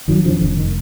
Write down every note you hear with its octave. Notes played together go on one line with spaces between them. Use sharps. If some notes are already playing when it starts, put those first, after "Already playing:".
F2 D#3 F#3
D3 F3
F1 D3
D#3